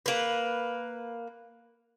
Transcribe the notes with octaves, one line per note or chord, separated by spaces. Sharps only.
A#3 B4